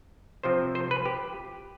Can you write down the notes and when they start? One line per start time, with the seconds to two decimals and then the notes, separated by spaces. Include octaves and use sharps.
0.43 C3 F3 C4 C5
0.75 C5
0.91 B4
1.05 G4